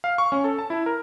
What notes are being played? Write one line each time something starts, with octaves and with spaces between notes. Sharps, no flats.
F5
C#6
C#4
A4
A5
E4
A#4